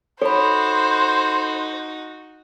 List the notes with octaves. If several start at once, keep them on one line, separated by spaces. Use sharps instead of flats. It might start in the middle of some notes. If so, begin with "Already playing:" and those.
D#4 F#4 A4 C5 C#5 B5